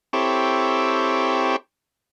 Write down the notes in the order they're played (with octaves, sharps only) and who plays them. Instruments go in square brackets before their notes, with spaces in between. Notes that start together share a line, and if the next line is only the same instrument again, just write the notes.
[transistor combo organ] C4 E4 G4 A4 C#5